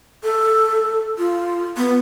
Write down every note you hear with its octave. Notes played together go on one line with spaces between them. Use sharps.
A4
F4
B3